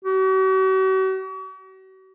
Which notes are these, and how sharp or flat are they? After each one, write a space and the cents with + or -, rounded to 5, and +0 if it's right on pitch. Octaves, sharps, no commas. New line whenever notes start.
F#4 +45